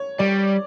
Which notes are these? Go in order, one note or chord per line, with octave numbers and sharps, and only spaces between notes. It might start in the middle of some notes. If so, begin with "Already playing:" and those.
Already playing: C#5
G3 D5